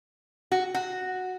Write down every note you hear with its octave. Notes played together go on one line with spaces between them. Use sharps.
F#4
F#4